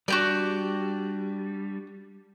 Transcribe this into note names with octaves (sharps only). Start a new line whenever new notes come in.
G3 D4 F#4 G4 D5